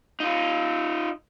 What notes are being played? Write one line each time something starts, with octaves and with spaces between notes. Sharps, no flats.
D#4 F4